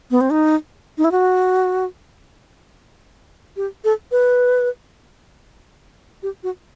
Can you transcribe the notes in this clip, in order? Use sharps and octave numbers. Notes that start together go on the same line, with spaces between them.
B3
C4
D#4
D#4
E4
F#4
G4
A4
B4
G4
F#4